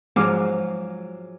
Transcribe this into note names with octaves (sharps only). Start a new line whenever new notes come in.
G#2 F3 F#3 D6 F6